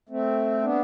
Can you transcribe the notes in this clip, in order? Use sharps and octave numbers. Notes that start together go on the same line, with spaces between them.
A3 C4
B3 D4